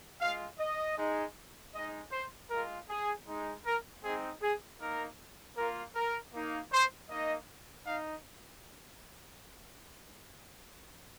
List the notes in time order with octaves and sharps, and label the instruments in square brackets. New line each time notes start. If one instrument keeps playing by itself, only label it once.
[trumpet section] G#3 F4 F5
D#5
G#3 D#4
G#3 D#4 D#5
C5
G#3 F4 A#4
G#4
G#3 D#4
A#4
G#3 C4 D#4 G#4
G#4
A#3 D#4 A#4
A#3 F4 A#4
A#4
A#3 D#4
C5
A#3 D#4 D#5
D#4 F5